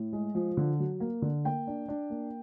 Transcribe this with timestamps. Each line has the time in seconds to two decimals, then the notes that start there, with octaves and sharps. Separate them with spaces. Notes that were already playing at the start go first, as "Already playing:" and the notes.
Already playing: A2
0.13 G#3
0.35 F3
0.57 D3
0.80 F#3
1.00 A#3
1.22 D3
1.44 A#3 G5
1.67 D4
1.88 D4
2.10 A#3